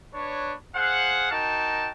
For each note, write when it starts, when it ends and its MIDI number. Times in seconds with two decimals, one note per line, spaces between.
0.13 0.54 62
0.13 0.54 71
0.13 0.54 73
0.74 1.30 68
0.74 1.30 72
0.74 1.30 77
0.74 1.30 78
1.30 1.91 63
1.30 1.91 66
1.30 1.91 70
1.30 1.91 79
1.30 1.91 81